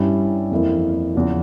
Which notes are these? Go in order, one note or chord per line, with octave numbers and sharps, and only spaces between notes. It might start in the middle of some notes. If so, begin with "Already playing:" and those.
Already playing: G2 G3 C#4 E4
F2 E3 A#3 E4
E2 C#3 F3